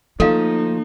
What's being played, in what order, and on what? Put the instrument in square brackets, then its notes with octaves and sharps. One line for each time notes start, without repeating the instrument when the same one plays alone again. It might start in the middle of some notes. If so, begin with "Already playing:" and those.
[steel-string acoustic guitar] D2 F3 [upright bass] A#3 [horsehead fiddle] D#4 [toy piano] A4 F5